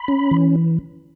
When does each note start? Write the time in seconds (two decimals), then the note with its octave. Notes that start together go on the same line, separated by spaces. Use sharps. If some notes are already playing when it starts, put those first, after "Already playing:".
Already playing: B5
0.08 C#4
0.31 E3